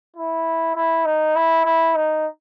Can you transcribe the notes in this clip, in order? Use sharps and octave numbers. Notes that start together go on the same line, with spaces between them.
E4
E4
D#4
E4
E4
D#4